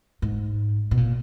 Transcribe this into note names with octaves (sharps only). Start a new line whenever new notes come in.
G#2
B2
A#2